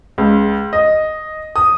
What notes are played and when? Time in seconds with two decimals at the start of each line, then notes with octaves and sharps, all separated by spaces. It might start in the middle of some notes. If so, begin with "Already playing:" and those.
0.18 C#2
0.73 D#5
1.56 D#6